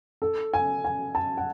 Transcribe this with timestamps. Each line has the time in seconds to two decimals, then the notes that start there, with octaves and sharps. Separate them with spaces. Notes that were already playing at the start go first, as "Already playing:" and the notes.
0.22 A4
0.54 G#5
0.84 G#5
1.15 A5
1.37 F#5